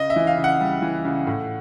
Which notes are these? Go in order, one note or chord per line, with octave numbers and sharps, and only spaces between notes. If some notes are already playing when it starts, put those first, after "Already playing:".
Already playing: C#3 D#5
E5
E3
F5
C#3
F#5
G3
E3
C#3
A2